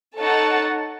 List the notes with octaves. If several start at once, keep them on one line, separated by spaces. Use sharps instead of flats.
D#4 A4 C#5 F#5 A5